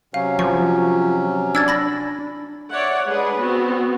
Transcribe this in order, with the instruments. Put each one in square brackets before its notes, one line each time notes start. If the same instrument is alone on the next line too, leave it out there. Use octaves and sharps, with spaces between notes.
[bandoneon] C3 F#3 C#4 [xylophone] F5
[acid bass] F3 [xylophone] C#6
[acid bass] D4 [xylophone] E6 G#6 A6
[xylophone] B5 A6 A#6
[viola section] C#5 D5 E5 F#5
G#3 D4 G#4 B4
B3 C4 F#4